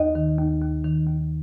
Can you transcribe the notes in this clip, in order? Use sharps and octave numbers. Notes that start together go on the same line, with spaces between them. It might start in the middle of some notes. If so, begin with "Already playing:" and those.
Already playing: D#2 D#5
D#3
D#2
D#2
D#3
D#2